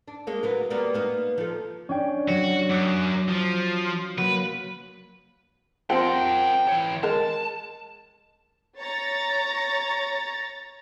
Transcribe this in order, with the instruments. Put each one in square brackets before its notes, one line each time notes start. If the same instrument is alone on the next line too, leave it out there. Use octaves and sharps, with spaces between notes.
[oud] D4
G#3 A#3 C#4
F#3 B3 A#4
G3 A#3 B3
A#3 B3 D#4
F3 A4
[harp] C#4 D4 G5
[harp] F#3 C#5 [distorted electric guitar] F#4
[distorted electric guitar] F#2 [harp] D6 D#6 F#6
[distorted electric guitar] F3
[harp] F#3 A#3 [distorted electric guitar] B4
[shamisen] F3 C4 [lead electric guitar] A#4 F#5 [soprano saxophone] G5
[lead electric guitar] E3 C#5
[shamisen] G#3 A#4 [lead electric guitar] A5
[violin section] C#5 A#5 A6